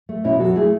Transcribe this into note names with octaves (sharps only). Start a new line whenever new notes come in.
A3
B2 C#4 E4
F#3 F#4 A4
A3 E4 G#4